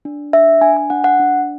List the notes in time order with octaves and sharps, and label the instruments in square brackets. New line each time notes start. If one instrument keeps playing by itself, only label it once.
[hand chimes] D4
D4 E5
D4 G#5
G#5
D4 F#5
F#5
D4